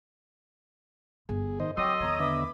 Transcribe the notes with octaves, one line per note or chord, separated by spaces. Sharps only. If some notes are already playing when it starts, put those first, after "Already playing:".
G1 G#4
D#3 C5 D#5
F#3 C4 A4 C#5 D#5 G5 C6 D6
E2 D#3 C#5 A#5 G#6
D3 B3 E5 B5 D6